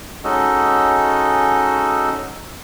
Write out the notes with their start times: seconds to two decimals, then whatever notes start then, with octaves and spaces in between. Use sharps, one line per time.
0.24 G#3 C#4 D#4 F#4 A4 D#5